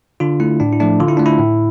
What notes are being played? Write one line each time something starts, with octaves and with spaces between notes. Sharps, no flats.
D3 D4 F4
A3 E4
A2 D4
E4
F3 A3 D4
D3 F4
E4
A3 D4
E4
A2